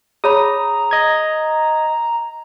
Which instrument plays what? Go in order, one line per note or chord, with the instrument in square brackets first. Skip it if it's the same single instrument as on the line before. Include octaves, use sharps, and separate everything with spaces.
[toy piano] G#4 C#5 B5 [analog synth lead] A#5 [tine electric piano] D#6
[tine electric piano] D#5 G#6